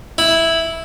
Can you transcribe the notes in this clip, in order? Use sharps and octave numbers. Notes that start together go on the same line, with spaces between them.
E4